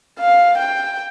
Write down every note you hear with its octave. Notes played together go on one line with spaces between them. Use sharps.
F5
G5